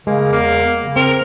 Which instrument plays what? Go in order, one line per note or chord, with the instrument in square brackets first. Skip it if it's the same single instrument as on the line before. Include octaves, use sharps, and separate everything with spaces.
[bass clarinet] C#3 [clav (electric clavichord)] G#3 [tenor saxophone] A#3
[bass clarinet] E2 [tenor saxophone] A#3
[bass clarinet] C#3
[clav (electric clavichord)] C4 [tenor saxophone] A#4